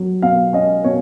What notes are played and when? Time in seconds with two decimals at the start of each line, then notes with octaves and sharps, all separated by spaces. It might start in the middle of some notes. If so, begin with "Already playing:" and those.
Already playing: F#3
0.22 B2 F5
0.53 C#4 D#5
0.84 B2 C#5